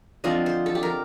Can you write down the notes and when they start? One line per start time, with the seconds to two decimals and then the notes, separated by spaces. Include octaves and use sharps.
0.24 D3 F3 C4 D#5
0.46 C5
0.66 A4
0.75 G4
0.83 A#4